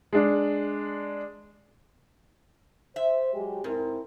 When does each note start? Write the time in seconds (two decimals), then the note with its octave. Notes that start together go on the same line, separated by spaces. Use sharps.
0.13 G#3 D4
2.96 C5 E5
3.34 F#3 G#3 G4
3.64 G#2 C4 E4 A#4